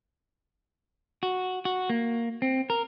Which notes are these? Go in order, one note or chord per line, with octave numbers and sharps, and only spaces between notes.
F#4
F#4
A#3
C4
A#4